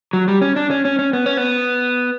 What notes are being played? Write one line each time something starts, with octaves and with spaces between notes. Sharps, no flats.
F#3
G3
C#4
D4
C#4
C#4
C#4
B3
C#4
B3